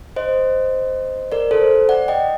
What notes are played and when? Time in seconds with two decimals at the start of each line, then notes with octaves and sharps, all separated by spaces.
0.16 C5 D#5
1.32 A#4 D5
1.51 A4 C5
1.89 D5 F#5
2.08 D#5 G5